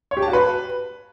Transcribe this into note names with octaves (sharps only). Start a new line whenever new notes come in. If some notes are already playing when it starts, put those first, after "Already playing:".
C#5
G4
A5
F#4
B4